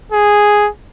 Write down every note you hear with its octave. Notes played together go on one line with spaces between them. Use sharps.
G#4